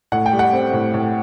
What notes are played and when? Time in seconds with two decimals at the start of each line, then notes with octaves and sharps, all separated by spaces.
0.12 A2 F#5
0.26 G5
0.33 G3
0.39 F#5
0.53 C4
0.73 A2
0.94 A2